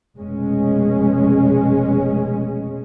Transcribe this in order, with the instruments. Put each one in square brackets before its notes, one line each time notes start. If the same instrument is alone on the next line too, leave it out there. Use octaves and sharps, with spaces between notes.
[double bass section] F1 B2 G#3 C#4